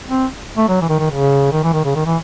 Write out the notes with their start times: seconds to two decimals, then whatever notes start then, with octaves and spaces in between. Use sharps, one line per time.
0.09 C4
0.57 A3
0.68 F#3
0.81 E3
0.89 D#3
0.99 D#3
1.10 C#3
1.52 D#3
1.64 E3
1.73 D#3
1.85 C#3
1.95 D#3
2.05 E3